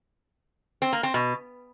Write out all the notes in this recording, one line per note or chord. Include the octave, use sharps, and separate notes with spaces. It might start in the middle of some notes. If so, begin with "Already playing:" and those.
C4
A#3
C4
B2